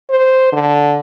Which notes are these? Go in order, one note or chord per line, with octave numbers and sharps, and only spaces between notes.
C5
D3